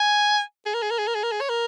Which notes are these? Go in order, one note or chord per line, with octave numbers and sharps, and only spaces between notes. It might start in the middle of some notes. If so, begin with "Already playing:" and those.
Already playing: G#5
G#4
A#4
G#4
A#4
G#4
A#4
G#4
A#4
G#4
C#5
A#4